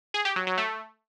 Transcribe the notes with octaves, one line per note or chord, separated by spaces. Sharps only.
G#4
G4
F#3
F#3
A3